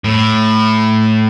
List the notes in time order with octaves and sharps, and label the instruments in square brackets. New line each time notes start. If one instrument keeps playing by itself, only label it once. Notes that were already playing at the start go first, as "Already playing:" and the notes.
[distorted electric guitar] A2